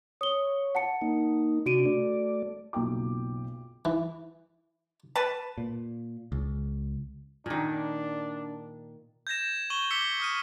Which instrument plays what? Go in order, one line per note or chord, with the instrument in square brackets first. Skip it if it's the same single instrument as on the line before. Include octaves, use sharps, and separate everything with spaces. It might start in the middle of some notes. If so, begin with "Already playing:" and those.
[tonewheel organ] C#5 [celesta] D#6 G7
[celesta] F#5 A5 C#7
[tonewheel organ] A#3 D#4
[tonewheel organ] C3 D4 [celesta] F#4 D7 D#7
[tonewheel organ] A3 D5
[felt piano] F#1 B1 F4 G5 D6
[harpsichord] E3
[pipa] B4 A5
[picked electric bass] A#2
C#2
[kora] A#2 D#3 [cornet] D4
[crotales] G6 G#6 A#6 E7
C#6 D#7 F#7 G7
D6 E6 B6 C#7 G7
D#6 F6 D#7